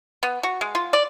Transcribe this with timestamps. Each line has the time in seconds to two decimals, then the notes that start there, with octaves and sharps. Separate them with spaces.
0.23 B3
0.43 F#4
0.61 G#3
0.75 F4
0.93 D5